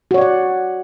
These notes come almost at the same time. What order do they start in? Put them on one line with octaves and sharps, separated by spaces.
F#4 C#5 D5 F#5